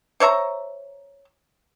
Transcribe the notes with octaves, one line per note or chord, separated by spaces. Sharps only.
C5 C#5 E5 A#5